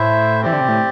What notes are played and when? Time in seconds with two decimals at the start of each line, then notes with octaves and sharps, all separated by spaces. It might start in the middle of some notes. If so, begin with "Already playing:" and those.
Already playing: A2 E4 C5 E5
0.41 E3 C4 G4 D5
0.53 D3
0.61 C3
0.68 A2